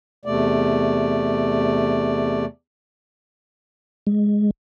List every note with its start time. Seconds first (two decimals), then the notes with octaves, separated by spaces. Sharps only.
0.25 E2 C3 A3 D5
4.07 G#3